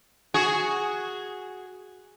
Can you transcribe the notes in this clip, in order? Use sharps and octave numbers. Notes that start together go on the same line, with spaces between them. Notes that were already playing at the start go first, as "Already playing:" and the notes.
F#4 G#4